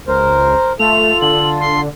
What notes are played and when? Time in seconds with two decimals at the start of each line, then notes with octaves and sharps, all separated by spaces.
0.08 C#2 A#4 C5
0.79 A3 F4 A4 F7
1.22 D3 F#7
1.60 C6